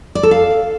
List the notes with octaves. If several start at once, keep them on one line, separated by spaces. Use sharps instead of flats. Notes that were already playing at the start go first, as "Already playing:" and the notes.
D5
A4
F5